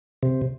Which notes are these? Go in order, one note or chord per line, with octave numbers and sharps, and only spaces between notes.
C3